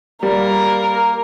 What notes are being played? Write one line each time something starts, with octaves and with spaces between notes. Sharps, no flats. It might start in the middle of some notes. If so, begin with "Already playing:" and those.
G3 A#3 A#4